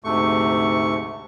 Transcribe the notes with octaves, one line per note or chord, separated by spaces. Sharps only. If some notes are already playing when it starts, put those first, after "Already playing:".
D2 G#2 C3 A3 C#6